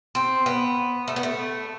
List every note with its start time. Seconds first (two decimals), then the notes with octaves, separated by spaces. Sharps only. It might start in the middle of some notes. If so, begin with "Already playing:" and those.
0.15 C4
0.46 B3
1.08 A3
1.16 B3
1.23 A3